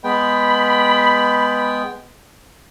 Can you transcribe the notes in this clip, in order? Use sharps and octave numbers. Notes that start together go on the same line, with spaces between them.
G#3 B3 G5 B5